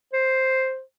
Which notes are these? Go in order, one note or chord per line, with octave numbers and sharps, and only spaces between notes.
C5